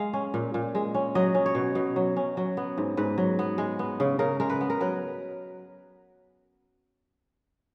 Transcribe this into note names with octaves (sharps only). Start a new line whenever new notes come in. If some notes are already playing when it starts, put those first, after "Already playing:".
Already playing: G#3 F5
C#4
A#2
A#2
G#3
C#4
F#3 D#5
C#4
C#5
B2
B2
F#3
C#4
F#3
B3
G#2
G#2 B4
F#3
B3
G#3
B3
C#3
C#3 A#4
G#3 A#4
B4
B3
A#4
F#3 B4